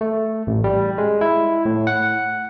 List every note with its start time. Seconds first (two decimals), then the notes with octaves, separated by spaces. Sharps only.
0.01 A3
0.47 A1
0.64 G3
0.98 G#3
1.21 E4
1.65 A2
1.87 F#5